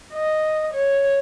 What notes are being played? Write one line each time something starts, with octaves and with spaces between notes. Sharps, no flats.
D#5
C#5